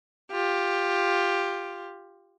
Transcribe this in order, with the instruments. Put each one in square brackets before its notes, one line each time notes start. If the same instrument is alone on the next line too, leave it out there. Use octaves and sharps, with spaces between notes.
[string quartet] F4 G4